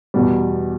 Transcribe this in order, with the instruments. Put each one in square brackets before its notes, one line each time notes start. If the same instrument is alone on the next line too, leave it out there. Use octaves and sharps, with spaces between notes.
[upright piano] E2 B2 G3